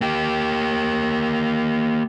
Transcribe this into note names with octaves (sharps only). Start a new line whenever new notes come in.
A#3 G4